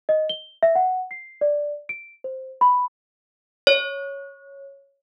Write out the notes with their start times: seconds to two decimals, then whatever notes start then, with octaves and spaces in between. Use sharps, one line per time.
0.09 D#5
0.29 G7
0.63 E5
0.75 F#5
1.11 C7
1.41 D5
1.89 D7
2.24 C5
2.61 B5
3.67 C#5